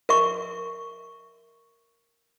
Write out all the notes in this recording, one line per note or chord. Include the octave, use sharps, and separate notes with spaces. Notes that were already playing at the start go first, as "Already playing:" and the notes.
A#4 E5 C#6